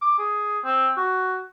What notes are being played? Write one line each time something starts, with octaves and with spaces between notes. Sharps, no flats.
D6
G#4
C4
F#4